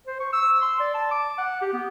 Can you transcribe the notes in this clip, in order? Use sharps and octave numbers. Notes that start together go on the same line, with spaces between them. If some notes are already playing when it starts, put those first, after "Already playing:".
C5
C#6
E6
C6
D5
A5
D6
F#5
G4
B3